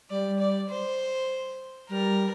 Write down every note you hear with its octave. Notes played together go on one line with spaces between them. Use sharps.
G3 D5
D5
C5
G3 A#4